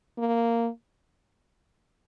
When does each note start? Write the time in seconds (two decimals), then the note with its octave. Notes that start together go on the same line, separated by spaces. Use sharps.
0.18 A#3